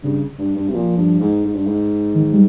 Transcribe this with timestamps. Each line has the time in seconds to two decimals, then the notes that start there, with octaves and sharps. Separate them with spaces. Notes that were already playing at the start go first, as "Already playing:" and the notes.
0.03 G2 C#3
0.39 G2
0.56 G2
0.69 C3
0.74 A#2 F3
0.97 G2
1.21 G#2
1.45 G#2
1.55 G2
1.67 G#2
2.15 D#3
2.33 G3